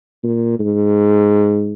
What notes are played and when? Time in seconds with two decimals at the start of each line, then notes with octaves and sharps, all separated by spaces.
0.23 A#2
0.59 G#2